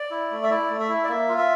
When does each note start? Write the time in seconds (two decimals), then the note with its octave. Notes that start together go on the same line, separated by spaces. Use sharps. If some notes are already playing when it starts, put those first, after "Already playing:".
Already playing: D5
0.11 E4
0.31 A3
0.44 E5
0.50 E4 D5
0.70 A3
0.80 E5
0.89 E4
1.04 D5
1.09 A#3 E5
1.29 F4
1.38 E5